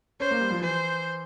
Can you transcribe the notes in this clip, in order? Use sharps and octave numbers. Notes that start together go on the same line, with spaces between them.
C#4 C5
A#3
G3
F3
E3 C5